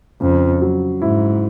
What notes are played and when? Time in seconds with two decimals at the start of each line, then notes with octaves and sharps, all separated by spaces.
0.21 F2 C#3
0.62 F#3
1.02 G#2 E4